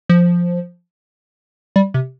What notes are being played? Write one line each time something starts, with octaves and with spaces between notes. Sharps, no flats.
F3
G3
C3